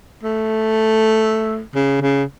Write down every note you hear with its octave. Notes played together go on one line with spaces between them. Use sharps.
A3
C#3
C#3